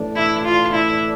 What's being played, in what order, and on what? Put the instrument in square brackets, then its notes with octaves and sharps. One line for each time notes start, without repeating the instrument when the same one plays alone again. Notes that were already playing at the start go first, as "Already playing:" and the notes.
Already playing: [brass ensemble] A2 E3 A3 D4
[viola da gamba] E4
F4
E4